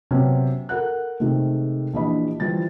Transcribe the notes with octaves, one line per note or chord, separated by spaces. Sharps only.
C3 F#3 B3 C#4 F#4
A4 A#4 F#5 F#6
C3 D#3 G#3 A3
A#1 E3 D4 G4 D#5 B5
E3 F3 G3 A6